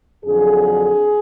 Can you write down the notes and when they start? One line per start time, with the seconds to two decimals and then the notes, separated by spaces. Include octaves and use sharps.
0.24 F2 D3 F#3 G#4